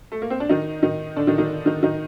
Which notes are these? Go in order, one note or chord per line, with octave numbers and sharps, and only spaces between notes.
A3
A#3
C4
D4
D#3 D#4
D#3 D#4
D3 D4
D#3 D#4
D#3 D#4
D#3 D#4
D#3 D#4